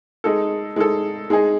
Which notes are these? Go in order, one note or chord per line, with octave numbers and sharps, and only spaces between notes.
G#3 D#4 A4
G#3 D#4 A4
G#3 D#4 G#4